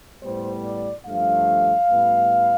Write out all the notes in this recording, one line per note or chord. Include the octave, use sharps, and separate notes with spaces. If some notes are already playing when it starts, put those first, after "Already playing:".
A2 G3 B3 C5
D5
G2 F3 A3 F5
A2 G3 B3